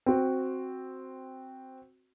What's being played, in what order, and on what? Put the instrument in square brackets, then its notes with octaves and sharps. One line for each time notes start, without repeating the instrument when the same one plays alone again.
[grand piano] C4 F#4